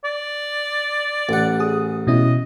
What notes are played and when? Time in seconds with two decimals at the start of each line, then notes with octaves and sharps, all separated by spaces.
0.05 D5
1.29 A1 F#5
1.60 G#4 D#6
2.07 B2 C#4 E4 D#5